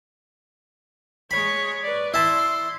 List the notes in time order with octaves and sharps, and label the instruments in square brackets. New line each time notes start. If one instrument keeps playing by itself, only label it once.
[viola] G#3 C#5 [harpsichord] B5
[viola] B4 D5
[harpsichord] E4 A5 [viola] C6